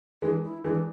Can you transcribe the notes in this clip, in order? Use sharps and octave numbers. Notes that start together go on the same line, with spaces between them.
E3 G#3 D4
E4
E3 G#3 D4